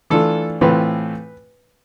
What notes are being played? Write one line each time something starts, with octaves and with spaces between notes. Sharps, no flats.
E3 A3 D4 F4 A4
A2 E3 A3 C4 F4 B4